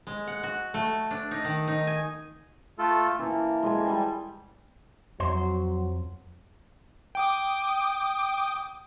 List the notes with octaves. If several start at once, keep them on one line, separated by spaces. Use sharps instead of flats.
G#3
F#5
F#4
A3
D4
D#4
D#3
D#4
G#5
A3 F4 A4
E3 A#3 A5
G#3 A4 G#5
G3 G5
F2 F#3 C5
G5 D6 D#6